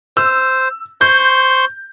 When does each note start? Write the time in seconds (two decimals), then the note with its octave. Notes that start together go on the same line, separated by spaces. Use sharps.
0.17 C5 E6
1.01 C5 C6 C#6 G6